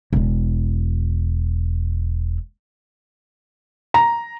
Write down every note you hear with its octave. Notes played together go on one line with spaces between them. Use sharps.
E1 E4
A#5